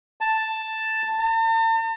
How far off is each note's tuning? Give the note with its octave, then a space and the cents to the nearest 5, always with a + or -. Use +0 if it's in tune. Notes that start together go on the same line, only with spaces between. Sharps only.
A5 +5
A5 +45